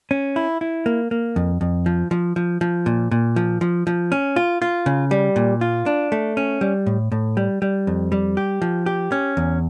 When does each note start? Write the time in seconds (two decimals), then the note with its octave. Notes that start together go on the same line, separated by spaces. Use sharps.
0.11 C#4
0.36 E4
0.61 E4
0.86 A#3
1.11 A#3
1.36 F2
1.61 F2
1.86 F3
2.11 F3
2.36 F3
2.61 F3
2.86 A#2
3.11 A#2
3.36 F3
3.61 F3
3.87 F3
4.12 C#4
4.36 F4
4.62 F4
4.86 C#3
5.11 G3
5.36 A#2
5.61 F4
5.86 D4
6.12 A3
6.37 C#4
6.61 G3
6.86 A2
7.12 A2
7.37 G3
7.62 G3
7.87 F2
8.12 G3
8.37 G4
8.62 F3
8.86 G4
9.12 C#4
9.37 E2